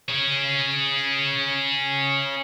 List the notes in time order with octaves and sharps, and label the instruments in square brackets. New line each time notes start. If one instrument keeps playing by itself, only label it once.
[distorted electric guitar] C#4 G#4